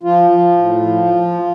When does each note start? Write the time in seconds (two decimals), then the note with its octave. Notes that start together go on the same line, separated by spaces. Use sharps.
0.03 F3 F4
0.31 F3
0.58 A2
0.87 F3
1.14 F3